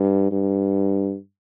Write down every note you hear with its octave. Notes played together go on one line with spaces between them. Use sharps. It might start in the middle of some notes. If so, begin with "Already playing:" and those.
Already playing: G2
G2